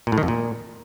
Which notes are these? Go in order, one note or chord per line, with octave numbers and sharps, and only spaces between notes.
A#2
A2
D#3
F2
A#2